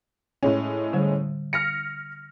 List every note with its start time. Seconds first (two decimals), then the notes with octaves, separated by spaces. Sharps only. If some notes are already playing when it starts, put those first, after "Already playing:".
0.43 A2 G#3 C#4
0.93 D3 G3
1.53 F6 A#6 C#7